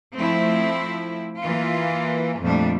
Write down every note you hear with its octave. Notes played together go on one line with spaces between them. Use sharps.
F3 A3 C4 E4
E3 A#3 F4
F2 A#2 G3 A3 D4